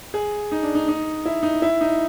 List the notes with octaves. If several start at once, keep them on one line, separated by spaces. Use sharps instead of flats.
G#4
D#4
D4
D#4
D#4
E4
D#4
E4
D#4